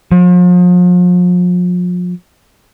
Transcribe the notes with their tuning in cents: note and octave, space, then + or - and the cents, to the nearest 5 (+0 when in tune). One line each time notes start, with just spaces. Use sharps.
F3 +40